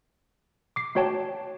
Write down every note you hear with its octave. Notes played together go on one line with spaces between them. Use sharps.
D6 C7
A3 F#4 C#5 G5 A5